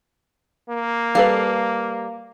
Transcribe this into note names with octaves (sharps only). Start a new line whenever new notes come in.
A#3
G3 A4 B4 F5